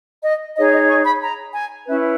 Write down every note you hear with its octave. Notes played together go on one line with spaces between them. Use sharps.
D#5
D#4 G#4 C#5 D#5
D#5
C#6
B5
A#5
G#5
C#4 E4 B4 E5